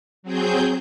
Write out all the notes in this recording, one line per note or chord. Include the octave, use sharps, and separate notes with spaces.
F#3 C4 G#4 G6